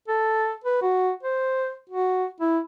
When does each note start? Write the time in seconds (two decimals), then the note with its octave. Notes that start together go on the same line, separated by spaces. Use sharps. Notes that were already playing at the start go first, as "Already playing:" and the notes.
0.08 A4
0.64 B4
0.82 F#4
1.23 C5
1.90 F#4
2.40 E4